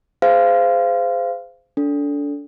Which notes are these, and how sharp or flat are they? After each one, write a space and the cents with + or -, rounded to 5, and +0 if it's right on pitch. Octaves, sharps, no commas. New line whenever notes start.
G#4 +0 C5 -20 F5 -20
D4 -30 A4 +0